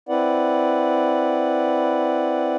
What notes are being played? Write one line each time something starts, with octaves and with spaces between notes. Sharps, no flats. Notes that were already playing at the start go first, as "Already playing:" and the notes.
C4 E4 B4 D5 F#5